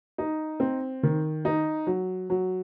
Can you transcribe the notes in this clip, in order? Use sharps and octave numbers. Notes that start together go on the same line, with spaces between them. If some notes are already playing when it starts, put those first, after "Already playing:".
D#4
C4
D#3
D#4
F#3
F#3